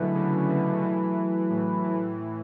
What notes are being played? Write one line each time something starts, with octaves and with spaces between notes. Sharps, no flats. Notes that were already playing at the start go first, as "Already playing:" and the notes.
Already playing: B2 D3 F#3 A3 E4 G#4 B4
C#3
D3
E3
A2
E3